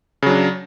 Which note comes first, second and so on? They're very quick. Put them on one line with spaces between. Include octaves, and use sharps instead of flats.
C#3 F#3 D4